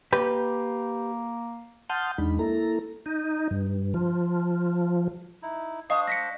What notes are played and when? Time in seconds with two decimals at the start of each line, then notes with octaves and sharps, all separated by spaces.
0.13 A#3 G4 B4
1.89 F#5 A5 C6 D#6 F6 G6
2.18 E2 G#3 D4 D#4 B5
2.39 A#3 E4 A4 A#5
3.06 D#4
3.51 G2
3.94 F3
5.43 D#4 E4
5.90 D4 C5 D#5 F5 F#5 B5 C#6 D#6
6.07 D#5 E6 A#6 B6 C#7